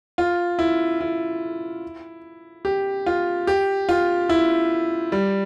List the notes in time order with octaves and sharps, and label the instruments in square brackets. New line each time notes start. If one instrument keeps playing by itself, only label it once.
[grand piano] F4
E4
E4
G4
F4
G4
F4
E4
G3